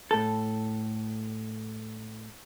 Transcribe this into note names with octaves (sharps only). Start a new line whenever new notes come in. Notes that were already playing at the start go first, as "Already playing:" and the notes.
A2 A4